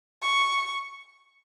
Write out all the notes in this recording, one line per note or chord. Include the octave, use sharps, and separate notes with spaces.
C#6